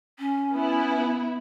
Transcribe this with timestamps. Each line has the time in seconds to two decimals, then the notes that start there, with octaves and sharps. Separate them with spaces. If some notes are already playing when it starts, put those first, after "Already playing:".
0.19 C#4
0.53 B3 E4